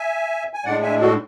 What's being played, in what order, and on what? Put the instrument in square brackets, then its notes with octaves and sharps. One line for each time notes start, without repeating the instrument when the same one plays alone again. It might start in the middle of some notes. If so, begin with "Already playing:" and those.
Already playing: [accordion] E5 G#5
G#5
A2 G#3 D4 D5 F#5
E5 G#5
F#4 A4